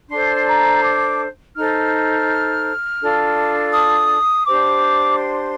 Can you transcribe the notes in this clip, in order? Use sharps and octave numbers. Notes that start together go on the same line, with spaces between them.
D4 A4 C5 C6
A#5
D6
D#4 A4 C5 F6
D4 F4 A4
D#6
D4 G4 C5 D6
C6